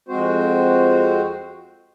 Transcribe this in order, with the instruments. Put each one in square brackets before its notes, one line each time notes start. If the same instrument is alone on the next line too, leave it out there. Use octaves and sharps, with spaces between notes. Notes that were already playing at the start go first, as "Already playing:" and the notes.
[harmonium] F2 G#3 C4 F#4 C5